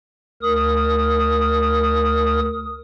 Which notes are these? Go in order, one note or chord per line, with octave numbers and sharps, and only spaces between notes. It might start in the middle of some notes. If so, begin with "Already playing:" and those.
D2 A#4 D#6